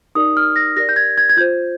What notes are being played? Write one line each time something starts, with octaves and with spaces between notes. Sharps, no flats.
D#4 G4 A#4 D5 D#6
F6
A#6
G4 A#4 D5 A#6
G6
G#6
G#6
G#6
F4 C5 G6